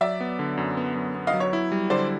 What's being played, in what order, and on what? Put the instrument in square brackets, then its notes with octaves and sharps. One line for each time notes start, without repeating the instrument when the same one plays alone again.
[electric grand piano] F#3 [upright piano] D5 E5
[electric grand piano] B3
D3
F#2
B3
F#2
B3
[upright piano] D#5 F5
[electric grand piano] F#3
[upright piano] C#5
[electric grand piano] E4
G3
[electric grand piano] D3 [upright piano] C5 D5